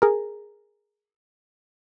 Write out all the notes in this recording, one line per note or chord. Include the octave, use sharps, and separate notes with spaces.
G#4 A#4